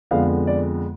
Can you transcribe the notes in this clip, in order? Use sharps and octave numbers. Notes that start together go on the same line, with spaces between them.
F2 D3 G#3 B3 F5
D5